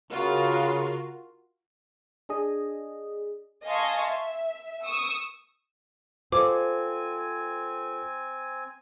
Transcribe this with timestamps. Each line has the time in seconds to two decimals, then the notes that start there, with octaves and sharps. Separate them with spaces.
0.11 C#3 F4 F#4 A#4
2.29 D4 G#4 D#5
3.65 D#5 F5 G#5 A5 C6 C#6
4.10 E5
4.83 C#6 D#6 E6
6.32 C4 F4 A4 C5 D#5 G#5 D6